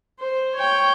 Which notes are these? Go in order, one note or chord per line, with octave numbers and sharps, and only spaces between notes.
C5
C#5 G5